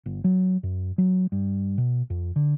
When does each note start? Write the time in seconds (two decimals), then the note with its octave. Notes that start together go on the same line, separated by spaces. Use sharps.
0.06 G1
0.24 F#3
0.63 F#2
0.98 F#3
1.32 G2
1.78 B2
2.10 F2
2.36 D3